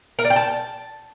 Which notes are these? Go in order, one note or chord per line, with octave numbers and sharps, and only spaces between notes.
A#4
D5
G5
A5